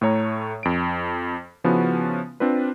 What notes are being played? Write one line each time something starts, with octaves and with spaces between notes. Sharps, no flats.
A2 A3 C#5 A#5
F2 D7
C#3 F3 B3 C#4 E4 F#4
C4 D4 F4 B4